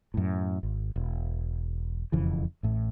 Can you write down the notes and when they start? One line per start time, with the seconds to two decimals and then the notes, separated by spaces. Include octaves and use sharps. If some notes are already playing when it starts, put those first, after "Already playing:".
0.14 F#2 A2
0.63 G#1
0.96 E1
2.12 E1 F2 C#3 E3
2.63 A1 A2